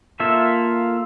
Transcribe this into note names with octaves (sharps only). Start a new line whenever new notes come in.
A#3 F4 A4 E5